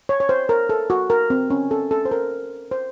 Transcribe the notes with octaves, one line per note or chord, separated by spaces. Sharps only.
C#5
C#5
C5
A#4
A4
F#4
A#4
C4
C#4
A4
A4
C5
A#4
C5